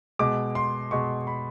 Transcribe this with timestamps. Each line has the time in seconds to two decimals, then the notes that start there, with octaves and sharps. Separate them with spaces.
0.19 B2 G#3 D6
0.55 C6
0.91 B2 G#3 C#6
1.27 B5